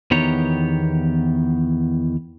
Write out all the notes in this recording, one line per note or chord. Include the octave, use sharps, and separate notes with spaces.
E2 D#3 B3 G4 C#5 A#5